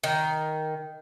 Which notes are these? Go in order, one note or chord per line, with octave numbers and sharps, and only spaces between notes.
D#3